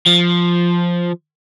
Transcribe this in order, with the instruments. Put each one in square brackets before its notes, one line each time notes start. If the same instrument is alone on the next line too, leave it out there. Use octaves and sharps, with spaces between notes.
[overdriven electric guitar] F3